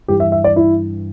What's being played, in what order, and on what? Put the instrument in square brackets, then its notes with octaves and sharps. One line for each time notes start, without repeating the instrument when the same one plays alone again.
[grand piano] G2 E3 G4
E5
E5
D5
E4